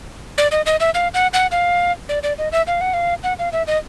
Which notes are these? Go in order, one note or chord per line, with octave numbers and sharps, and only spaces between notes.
D5
D#5
D#5
E5
F5
F#5
F#5
F5
D5
D5
D#5
E5
F5
F#5
F5
F#5
F5
E5
D#5